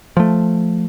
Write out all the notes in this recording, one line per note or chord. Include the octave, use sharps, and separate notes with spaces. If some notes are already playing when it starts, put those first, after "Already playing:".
F3 A3